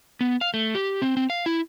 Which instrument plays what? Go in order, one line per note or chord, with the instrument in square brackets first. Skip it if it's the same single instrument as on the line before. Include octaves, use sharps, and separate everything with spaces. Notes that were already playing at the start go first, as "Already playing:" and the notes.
[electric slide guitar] B3
F5
A3
G4
C4
C4
F5
E4